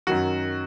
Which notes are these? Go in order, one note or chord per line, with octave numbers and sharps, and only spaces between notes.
F#2 D#3 F#3 F#4